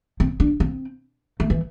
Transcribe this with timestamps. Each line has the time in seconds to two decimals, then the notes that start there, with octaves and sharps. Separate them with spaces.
0.20 C4
0.40 D4
0.60 C4
1.40 A3
1.50 E3